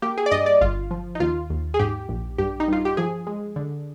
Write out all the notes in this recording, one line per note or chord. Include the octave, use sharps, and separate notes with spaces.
A#3 G4
G#4
D5
G2 D#5
D5
G1 F4
F3
D#4
D#2 F4
D#2
G#4
G#2 G4
A#1
G2 G4
D#4
G2 F4
G4
F3 G#4
G#3
D3